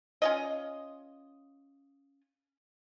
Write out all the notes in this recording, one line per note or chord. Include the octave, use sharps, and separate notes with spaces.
C#4 F4 D#5